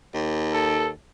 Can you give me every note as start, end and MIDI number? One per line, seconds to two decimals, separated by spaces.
0.14 0.92 39
0.53 0.89 69